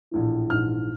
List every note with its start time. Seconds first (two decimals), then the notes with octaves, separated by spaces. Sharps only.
0.11 A#1 A2 E3
0.50 A#1 G#2 E3 F6